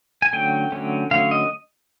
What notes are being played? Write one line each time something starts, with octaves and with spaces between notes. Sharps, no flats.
G#5
D3 F#3 A3 C#4 G5
D3 F#3 A3 C#4
D3 F#3 A3 C#4 F5
D#5